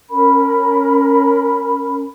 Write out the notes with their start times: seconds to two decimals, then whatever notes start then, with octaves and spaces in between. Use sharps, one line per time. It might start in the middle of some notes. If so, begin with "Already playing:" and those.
0.10 C#4 A#4 B5